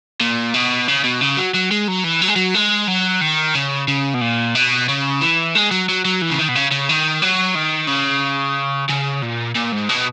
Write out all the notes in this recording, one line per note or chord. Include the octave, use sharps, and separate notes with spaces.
A#2
B2
C#3
B2
C#3
F#3
F#3
G#3
F#3
E3
F#3
G#3
F#3
G#3
F#3
D#3
C#3
C#3
B2
A#2
B2
C#3
E3
G#3
F#3
F#3
F#3
E3
C#3
D#3
B2
C#3
C#3
D#3
F#3
D#3
C#3
C#3
A#2
A#2
G#2
B2